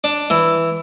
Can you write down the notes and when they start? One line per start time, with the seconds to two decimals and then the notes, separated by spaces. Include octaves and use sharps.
0.04 D4
0.30 E3